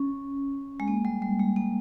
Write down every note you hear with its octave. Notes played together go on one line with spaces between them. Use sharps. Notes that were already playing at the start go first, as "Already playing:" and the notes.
Already playing: C#4
G#3
A#3
G3
G3
G#3
A#3